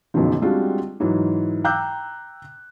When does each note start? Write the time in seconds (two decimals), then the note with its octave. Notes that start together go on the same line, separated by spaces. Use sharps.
0.14 F#1 F#2 B2 D3 D#3 F3
0.42 G3 G#3 C4 D4 F4 F#4
1.00 G#2 E3 F#3
1.64 G5 A#5 D6 E6 F#6 G6